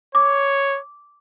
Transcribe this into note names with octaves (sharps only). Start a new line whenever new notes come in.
C#5 D6